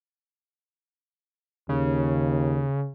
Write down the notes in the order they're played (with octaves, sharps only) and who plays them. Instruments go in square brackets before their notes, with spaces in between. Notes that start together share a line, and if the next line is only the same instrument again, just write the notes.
[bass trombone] D#2 [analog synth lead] C#3